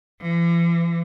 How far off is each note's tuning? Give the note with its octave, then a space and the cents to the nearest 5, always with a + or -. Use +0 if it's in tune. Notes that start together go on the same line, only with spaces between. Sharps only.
E3 +45